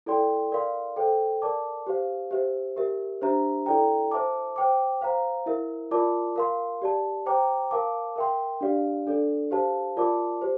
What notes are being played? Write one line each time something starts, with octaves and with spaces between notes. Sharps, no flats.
E4 A4 D5 G5 C6
A#4 D5 F5 C6
A4 C5 G5
A#4 D5 A5 D6
G4 C5 F5
G4 C5 E5
G4 A#4 E5
D4 G4 C5 E5 A#5
E4 A4 D5 G5 A#5
C5 E5 A5 D6
C5 G5 D6
C5 F5 A#5
E4 A#4 E5
F4 A#4 D5 A5 D6
A#4 F5 C6
G4 D5 A5
C5 G5 A#5 D6
A#4 F5 A5 D6
A#4 E5 G5 C6
D4 G4 D5 F5
D4 A4 D5
G4 C5 F5 A5
F4 A#4 D5 A5 D6
G4 C5